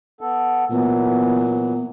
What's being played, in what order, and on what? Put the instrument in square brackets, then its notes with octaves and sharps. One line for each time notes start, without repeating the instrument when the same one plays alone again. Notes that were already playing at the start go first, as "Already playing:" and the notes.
[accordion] B3 A4
[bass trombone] A#2 [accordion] E3 F#3 [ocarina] B3